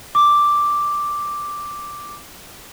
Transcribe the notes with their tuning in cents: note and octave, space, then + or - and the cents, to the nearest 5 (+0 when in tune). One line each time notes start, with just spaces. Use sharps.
D6 +0